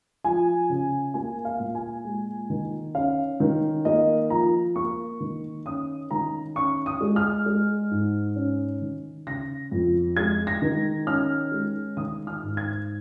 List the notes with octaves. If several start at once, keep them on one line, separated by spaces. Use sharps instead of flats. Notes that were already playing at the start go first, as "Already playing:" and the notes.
F3 G#5
C#3
A#3 G#5
F5
A#2
G#5
G#3
D#3
C#4 F5
D#3
A#3 D#5
F3 A#5
A#3 C#6
D#3
C#4 D#6
D#3 A#5
C#4 C#6
D#6
G#3
F6
G#3
G#2
C#4
D#3
C#3 A#6
F2
G#3 G#6
A#6
D#3
C#4 F6
G#3
D#3 D#6
F6
G#2
G#6